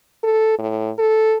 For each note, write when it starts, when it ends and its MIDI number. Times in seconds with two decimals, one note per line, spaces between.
0.24 0.55 69
0.59 0.90 45
0.99 1.37 69